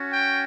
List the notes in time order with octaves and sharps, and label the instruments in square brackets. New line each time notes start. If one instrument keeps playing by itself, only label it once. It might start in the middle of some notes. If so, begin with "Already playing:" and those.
Already playing: [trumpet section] C#4 F#4
G5